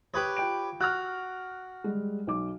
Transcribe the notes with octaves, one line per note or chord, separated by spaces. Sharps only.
G4 B4 C#5 D#6
F4 G5 D7
F#4 F6 F#6
G3 G#3
B1 D6